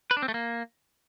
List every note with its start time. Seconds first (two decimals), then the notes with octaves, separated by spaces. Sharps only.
0.11 B4
0.17 D4
0.22 C4
0.28 A3
0.34 A#3